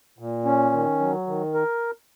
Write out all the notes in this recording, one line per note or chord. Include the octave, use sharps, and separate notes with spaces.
A#2
C#4
D#3
F#3
D#3
A#4